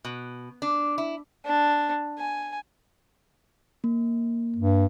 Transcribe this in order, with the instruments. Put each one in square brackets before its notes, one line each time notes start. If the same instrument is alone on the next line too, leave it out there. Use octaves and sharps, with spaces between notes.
[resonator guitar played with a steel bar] B2
D4
E4
[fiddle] D4
G#5
[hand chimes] A#3
[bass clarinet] G2